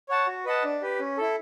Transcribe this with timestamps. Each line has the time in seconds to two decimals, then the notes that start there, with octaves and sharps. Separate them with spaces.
0.09 C#5 F#5 A5
0.27 F#4
0.45 B4 D#5 F#5 A5
0.64 D4
0.82 G4 B4
1.00 C#4
1.17 E4 A4